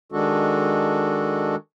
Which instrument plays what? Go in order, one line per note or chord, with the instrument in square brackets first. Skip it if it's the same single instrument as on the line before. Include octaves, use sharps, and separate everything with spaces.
[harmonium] D#3 G#3 D4 F#4 A4